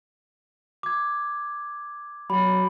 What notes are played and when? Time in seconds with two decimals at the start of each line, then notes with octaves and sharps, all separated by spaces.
0.83 D6 G#6
2.30 F#3 B5